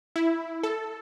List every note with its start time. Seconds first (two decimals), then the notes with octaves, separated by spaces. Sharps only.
0.16 E4
0.63 A4